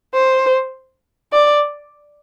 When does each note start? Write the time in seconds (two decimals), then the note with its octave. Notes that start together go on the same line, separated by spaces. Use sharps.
0.14 C5
1.33 D5